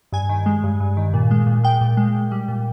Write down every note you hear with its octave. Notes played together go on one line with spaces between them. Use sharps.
G2 G#5
D#3
G#3
G2
G2
D#3
A#2
G#3
A#2
G#3 G5
A#2
G#3
A#2
G3
A#2